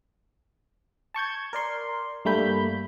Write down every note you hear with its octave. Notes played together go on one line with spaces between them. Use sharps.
A5 C#6 G6 G#6
A#4 D5 C6
G2 G3 A3 A#3 B5 G6